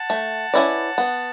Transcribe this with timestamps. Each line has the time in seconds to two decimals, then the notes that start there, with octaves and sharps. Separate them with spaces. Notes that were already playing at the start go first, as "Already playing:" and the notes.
Already playing: F#5 A5
0.10 A3
0.54 C#4 E4 B4 D5
0.98 B3